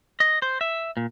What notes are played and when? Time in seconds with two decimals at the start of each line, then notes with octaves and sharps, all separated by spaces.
0.20 D#5
0.42 C5
0.61 E5
0.97 A#2